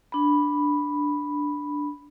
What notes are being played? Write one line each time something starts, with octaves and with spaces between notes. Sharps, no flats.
D4 B5